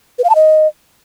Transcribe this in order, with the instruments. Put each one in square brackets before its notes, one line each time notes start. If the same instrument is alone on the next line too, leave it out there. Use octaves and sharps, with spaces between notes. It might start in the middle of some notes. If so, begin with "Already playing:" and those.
[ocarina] B4
F5
A5
D#5